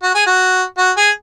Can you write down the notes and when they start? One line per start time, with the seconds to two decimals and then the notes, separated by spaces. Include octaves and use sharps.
0.03 F#4
0.14 G#4
0.27 F#4
0.78 F#4
0.97 G#4